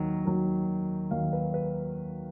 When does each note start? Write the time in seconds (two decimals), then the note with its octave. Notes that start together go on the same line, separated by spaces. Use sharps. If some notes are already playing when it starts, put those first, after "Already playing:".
Already playing: D#2 D#3 F#3
0.25 D#2 D#3 F#3
1.11 D#2 D#3 F#3 F5
1.33 B4
1.54 B4